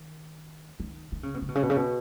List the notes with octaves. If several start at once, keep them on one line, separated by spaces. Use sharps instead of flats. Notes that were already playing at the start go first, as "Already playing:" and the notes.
Already playing: D#3
D#3
D#3
C#3
B2
C#3
B2
C#3
B2
C#3
B2